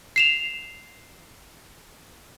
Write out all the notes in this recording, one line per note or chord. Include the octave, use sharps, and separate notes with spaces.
C7 E7 F7